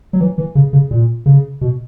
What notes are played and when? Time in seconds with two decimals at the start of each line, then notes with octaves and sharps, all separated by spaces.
0.13 F#3
0.20 E3
0.38 E3
0.55 C#3
0.73 C#3
0.91 A#2
1.26 C#3
1.61 B2